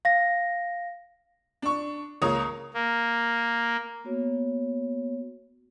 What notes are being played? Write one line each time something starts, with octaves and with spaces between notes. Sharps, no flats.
F5 A#6
D4 C#6
C#2 A#3 C#5 A#5 D#6
A#3
A#3 B3 F#4 C#5